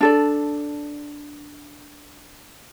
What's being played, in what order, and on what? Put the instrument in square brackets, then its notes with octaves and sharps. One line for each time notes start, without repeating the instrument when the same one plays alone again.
[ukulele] D4 A4 D5